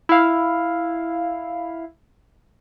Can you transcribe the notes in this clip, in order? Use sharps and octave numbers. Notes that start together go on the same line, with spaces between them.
E4 F5